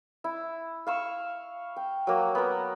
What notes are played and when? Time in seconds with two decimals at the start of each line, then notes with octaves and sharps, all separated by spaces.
0.24 E4
0.87 F5 C#6 E6
1.76 G5
2.07 F#3 A#3
2.35 B3 A#4